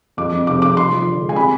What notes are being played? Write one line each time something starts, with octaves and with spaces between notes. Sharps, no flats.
F2 D6
F2
F1 D6
F1 D6
F3 C6
F3
D3
G#3
G#5
C3 B5